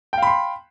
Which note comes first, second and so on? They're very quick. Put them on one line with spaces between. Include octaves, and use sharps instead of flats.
G5 F5 B5 C6